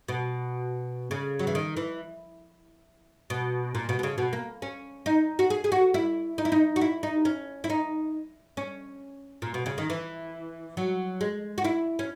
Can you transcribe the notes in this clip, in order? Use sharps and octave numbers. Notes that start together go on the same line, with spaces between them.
B2
C#3
F#3
E3
D#3
E3
B2
A#2
B2
B2
C#3
B2
A#3
C#4
D#4
F#4
G#4
G#4
F#4
E4
D#4
E4
D#4
F#4
E4
D#4
C#4
E4
D#4
C#4
A#2
B2
C#3
D#3
E3
F#3
G#3
F#4
E4
C#4